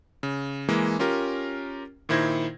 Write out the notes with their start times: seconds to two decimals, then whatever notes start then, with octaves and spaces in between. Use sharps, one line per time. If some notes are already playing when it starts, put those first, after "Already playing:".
0.23 C#3
0.69 E3 G#3 A#3
0.99 C#4 F4 G4 A#4
2.09 A#2 D#3 E4 C5 G#6 A#6